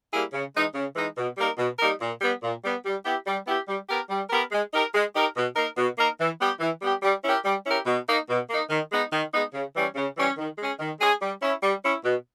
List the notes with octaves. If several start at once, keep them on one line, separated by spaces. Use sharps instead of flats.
G3 A#3 E4 G#4
C#3
E3 G#3 D#4
C#3
E3 G#3 D#4
B2
G3 A#3 D#4 A#4
B2
G3 A#3 D#4 A#4
A#2
G3 B3
A#2
G3 B3
G3
B3 E4 G4
G3
B3 E4 G4
G3
B3 G4 A#4
G3
B3 G4 A#4
G#3
D#4 G4 A#4
G#3
D#4 G4 A#4
B2
A#3 D#4 A#4
B2
A#3 D#4 A#4
E3
G3 B3 G4
E3
G3 B3 G4
G3
C#4 E4 G4 A#4
G3
C#4 E4 G4 A#4
B2
A#3 D#4
B2
A#3 D#4
D#3
G#3 B3 D#4
D#3
G#3 B3 D#4
C#3
E3 G3 C#4
C#3
E3 G3 C#4
D#3
G#3 C#4 G#4
D#3
G#3 C#4 G#4
G3
C#4 E4
G3
C#4 E4
B2